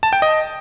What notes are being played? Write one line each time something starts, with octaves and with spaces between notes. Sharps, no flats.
A5
G5
D#5